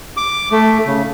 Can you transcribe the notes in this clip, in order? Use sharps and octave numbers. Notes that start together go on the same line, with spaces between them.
D6
A3
C#3